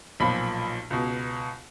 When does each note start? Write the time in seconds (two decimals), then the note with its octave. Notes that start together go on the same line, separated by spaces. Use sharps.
0.20 B1 A#2 F3 B5
0.90 C#2 B2